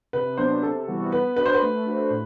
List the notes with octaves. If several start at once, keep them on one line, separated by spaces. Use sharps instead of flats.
C3 B4
F#3 B3 D4 C5
C3 A4
E3 G3 B3 F#4
B3 B4
D4 F#4 B4
C5
B4
A3
D4 F#4 C5
A2